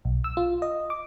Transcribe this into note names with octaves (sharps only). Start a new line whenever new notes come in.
B1
E6
F4
D#5
D6